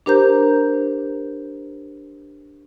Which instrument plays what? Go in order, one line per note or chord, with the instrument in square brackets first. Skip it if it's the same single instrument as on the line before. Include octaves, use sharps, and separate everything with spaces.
[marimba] D4 G4 A#4 C5 A#5 G6